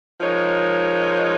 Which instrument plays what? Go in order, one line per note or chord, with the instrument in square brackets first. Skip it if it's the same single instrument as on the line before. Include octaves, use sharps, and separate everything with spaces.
[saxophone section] F3 G#3 D#4 A#4 C#5